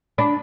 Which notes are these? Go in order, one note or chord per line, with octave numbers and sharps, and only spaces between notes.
D4 B5